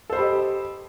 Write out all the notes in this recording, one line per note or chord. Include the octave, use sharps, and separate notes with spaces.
G4 A4 C5 D#5 B5